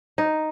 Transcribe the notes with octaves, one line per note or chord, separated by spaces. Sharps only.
D#4